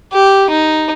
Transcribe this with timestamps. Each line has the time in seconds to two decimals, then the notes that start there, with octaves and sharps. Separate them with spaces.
0.13 G4
0.50 D#4